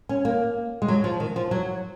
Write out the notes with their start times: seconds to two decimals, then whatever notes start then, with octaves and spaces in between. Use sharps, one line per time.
0.09 C#4
0.25 A#3
0.82 G#3
0.88 F#3
1.04 F3
1.20 D#3
1.36 F3
1.51 F#3